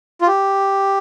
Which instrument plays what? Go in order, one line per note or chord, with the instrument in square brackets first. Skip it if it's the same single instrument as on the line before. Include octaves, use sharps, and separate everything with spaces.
[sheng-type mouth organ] F4
G4